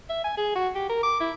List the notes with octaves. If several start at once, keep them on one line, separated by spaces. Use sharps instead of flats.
E5
G#5
G#4
F#4
G4
A#4
D6
E4